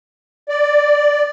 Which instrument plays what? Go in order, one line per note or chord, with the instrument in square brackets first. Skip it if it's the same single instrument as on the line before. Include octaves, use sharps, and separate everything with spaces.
[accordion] D5